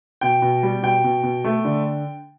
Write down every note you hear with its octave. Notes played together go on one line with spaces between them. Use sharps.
B2 G5
B2
G3
B2 G5
B2
B2
A3
D3